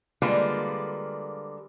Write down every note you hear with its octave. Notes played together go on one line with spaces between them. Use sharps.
D3 G3 G#3 A#3 F4 B4